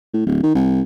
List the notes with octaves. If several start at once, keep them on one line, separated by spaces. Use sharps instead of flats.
A2
D1
D#3
C2